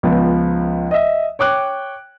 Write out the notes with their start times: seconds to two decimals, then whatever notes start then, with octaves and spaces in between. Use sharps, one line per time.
0.03 C#2 F3 B3
0.91 D#5 E5
1.39 C#5 G5 D6 F#6